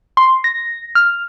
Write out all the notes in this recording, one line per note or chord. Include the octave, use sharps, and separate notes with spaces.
C6
A#6
F6